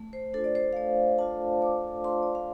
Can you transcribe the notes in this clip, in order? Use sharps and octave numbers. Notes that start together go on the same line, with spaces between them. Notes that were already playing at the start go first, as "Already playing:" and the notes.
Already playing: A3
C5
D4 F4 A4
D5
C5
F5
A3 D5
D4 F4 A5
A3 D6
D4 F4 C6
D5
F5